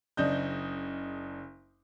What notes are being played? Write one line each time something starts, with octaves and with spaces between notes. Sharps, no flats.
F#1 C#3 D4 D#5 G6